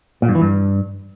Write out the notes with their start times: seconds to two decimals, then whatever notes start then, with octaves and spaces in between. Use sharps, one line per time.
0.22 A#2
0.29 G2
0.35 E3
0.42 G2